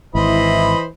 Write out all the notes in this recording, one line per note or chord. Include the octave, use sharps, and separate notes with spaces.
G#1 E3 E4 C5 D#5 B5